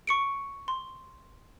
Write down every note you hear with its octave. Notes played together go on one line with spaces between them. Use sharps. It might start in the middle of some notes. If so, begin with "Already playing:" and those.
C#6 C#7 D7
C6